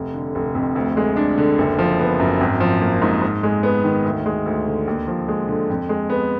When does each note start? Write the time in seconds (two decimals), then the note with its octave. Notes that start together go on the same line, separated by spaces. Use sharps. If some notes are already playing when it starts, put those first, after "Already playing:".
Already playing: F1
0.14 D3
0.35 F1
0.55 F2
0.75 D2
0.97 G#3
1.16 D4
1.38 D3
1.58 F#1
1.78 F3
1.99 B3
2.20 F#2
2.41 G#1
2.60 F3
2.81 A#3
3.02 G#2
3.22 G#2
3.43 G#3
3.63 B3
3.84 D#3
4.05 D2
4.26 G#3
4.46 D2
4.67 D3
4.88 D#2
5.07 F3
5.28 G#3
5.48 D3
5.70 F2
5.89 G#3
6.10 B3